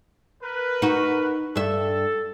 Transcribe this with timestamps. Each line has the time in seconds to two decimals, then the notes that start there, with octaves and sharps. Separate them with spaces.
0.43 A#4 B4
0.82 D#4 F#4
1.56 G2 A4 E5